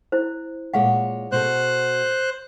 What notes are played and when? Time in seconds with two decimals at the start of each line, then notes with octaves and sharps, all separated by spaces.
0.12 E4 C5
0.73 A#2 G#3 G#4 C#5 F5 F#5
1.32 B2 F#4 A4 C5 F#6